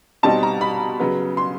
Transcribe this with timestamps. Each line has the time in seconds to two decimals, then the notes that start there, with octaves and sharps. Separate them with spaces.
0.23 B2 G3 C4 D#4 A5
0.43 A#5
0.61 B5
1.00 C#3 F#3 B3
1.37 C6